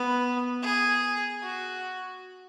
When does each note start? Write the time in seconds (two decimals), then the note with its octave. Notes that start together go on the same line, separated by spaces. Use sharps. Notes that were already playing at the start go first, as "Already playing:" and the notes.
Already playing: B3
0.62 G#4
1.43 F#4